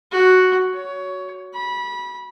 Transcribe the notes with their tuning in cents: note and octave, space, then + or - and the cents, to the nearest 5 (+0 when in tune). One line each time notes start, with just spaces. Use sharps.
F#4 +0
C#5 +20
B5 -25